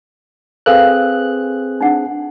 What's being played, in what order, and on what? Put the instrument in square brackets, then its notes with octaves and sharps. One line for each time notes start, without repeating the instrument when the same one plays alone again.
[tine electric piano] C4 G#4 F#6 [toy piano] A4 B4 F5
[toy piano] D4 D#4 F#5